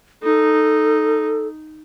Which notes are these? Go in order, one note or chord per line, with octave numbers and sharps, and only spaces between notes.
D#4 A4